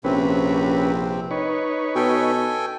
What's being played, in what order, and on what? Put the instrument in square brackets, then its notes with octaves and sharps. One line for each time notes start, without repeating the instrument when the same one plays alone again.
[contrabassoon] A#1 [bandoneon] C3 C4 [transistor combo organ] C#4 B4
[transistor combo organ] D#4 B4 C#5
[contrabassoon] B2 [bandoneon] A4 G5 G#5